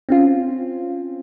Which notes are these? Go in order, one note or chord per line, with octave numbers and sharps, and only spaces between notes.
C4 C#4 F4